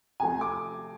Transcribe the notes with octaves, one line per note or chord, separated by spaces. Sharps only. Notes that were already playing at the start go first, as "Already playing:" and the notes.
C3 F3 A3 C4 G#5
D6